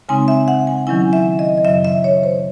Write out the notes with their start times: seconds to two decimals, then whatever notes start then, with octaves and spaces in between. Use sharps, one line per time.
0.09 C#3 G#3 C4 D#4 G#5
0.28 E5
0.48 F#5
0.67 G#5
0.87 D#3 F#3 C#4 E4 G#5
1.13 E5
1.39 D#5
1.58 D#5
1.65 F#2 C#3 F#3 E5
1.85 E5
2.04 C#5
2.23 C5